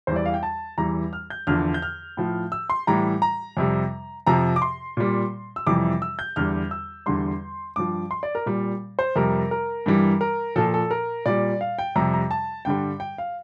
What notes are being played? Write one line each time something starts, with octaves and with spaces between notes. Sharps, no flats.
E2 E3 G3 C5
D5
F5
G5
A5
E2 E3 G3 A#5
F6
G6
E2 D3 F3 F6
G6
F6
A2 F3
E6
C6
A2 E3 G3 A#5
A#5
F2 C3 G3
F2 C3 F3 A#5
D6
C6
A#2 G3
E6
F2 C3 E3 G3 D6
E6
G6
E2 D3 G3 F6
E6
E2 D3 G3 C6
G2 F3 D6
C6
D5
A#4
A#2 G3
C5
F2 C3 G3 A#4
A#4
G2 E3 G3
A#4
A#2 F3 A4
A4
A#4
A#2 G3 D5
F5
G5
F2 C3 G3 A#5
A#5
A5
G2 D3 G3 G5
G5
F5